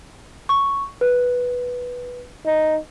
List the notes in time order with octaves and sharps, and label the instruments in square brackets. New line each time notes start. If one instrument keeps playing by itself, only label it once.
[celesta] C#6
B4
[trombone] D#4